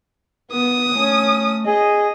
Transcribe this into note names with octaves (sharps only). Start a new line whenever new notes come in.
B3 D#6
A3 C#4
G#4 D#5